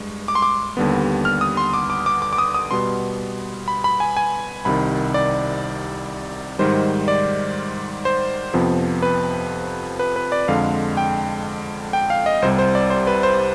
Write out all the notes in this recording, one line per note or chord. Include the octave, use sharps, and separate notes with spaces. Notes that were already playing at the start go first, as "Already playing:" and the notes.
Already playing: G2 G#3
D6
C6
D6
D#2 D3 G3 B3
F6
D#6
C6
D6
D6
D6
D6
D6
D#6
D#6
B2 G3 B3 C6
B5
B5
G#5
G#5
C2 C3 D#3 B5
D5
G#2 D#3 G3 C5
D5
C5
F2 C3 F3 B3
B4
B4
B4
D5
F2 D3 G#3 F5
G5
G5
F5
D#5
C2 C3 G3 C5
C5
D5
C5
B4
C5